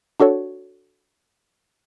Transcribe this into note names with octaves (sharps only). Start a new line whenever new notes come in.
D4 F#4 A4 C#5